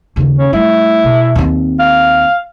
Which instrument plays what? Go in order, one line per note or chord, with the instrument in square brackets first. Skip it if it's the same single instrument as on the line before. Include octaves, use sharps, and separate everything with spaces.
[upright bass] D#2 C#3
[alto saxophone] C#4
[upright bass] G3 A3 [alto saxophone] E4
[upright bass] B2
D#2 C4
[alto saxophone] F5